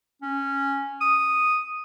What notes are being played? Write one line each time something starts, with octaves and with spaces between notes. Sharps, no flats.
C#4
D#6